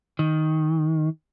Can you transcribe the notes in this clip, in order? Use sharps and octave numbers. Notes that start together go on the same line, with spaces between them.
D#3